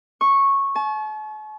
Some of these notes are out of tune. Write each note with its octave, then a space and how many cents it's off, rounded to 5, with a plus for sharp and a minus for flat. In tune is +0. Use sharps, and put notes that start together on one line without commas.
C#6 -10
A5 -45